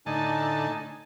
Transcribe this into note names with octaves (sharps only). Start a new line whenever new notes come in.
A2 D3 D#4 G#5 A5